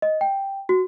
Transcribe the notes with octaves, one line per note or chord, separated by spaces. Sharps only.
D#5
G5
F#4